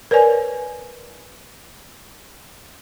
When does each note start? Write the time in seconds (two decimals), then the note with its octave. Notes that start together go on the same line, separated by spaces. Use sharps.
0.11 A#4 B4 C#5 D5 G#5